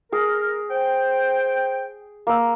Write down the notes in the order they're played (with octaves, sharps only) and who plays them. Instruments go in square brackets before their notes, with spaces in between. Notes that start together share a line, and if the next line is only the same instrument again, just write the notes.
[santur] G#4 [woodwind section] A#4
[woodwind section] C5 G5
[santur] A#3 E6